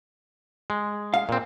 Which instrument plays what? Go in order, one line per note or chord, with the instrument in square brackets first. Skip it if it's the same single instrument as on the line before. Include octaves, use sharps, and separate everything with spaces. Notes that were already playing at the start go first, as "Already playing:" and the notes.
[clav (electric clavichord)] G#3
[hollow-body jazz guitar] F5
[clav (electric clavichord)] A#2 C4